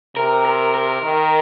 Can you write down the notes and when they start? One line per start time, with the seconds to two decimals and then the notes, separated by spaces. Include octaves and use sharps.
0.17 C3 A#4
0.45 A#4
0.75 A#4
1.02 D#3